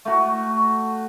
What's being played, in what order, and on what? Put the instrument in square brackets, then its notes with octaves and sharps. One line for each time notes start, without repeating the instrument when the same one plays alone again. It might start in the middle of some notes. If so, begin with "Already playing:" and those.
[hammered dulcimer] A3 F#4